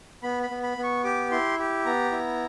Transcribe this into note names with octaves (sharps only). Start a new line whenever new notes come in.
B3 B5
B5
B3
B5
B3
C#6
G4 D6
E4 C6
G4
B3 A#5
E4